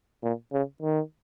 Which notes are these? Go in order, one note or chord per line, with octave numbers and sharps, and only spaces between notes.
A#2
C#3
D#3